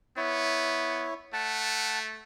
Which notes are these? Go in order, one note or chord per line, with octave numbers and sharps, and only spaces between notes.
B3 E4 C#5
A3 F#5 A5